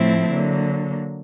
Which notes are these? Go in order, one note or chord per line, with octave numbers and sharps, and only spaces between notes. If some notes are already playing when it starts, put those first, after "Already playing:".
Already playing: A2 F3 A3 C4 E4
D3 F#3 A#3